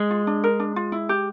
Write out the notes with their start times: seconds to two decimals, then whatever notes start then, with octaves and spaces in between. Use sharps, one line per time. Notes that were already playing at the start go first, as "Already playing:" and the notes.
Already playing: G#3
0.11 F4
0.27 D4
0.44 A#4
0.60 D4
0.76 F4
0.92 E4
1.09 G4